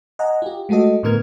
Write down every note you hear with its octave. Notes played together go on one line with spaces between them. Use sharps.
D#5 F#5 G#5 A#5
F4 G4
G#3 A3 F#4 A4 D#5
A2 D3 B3 A#4 F6 G#6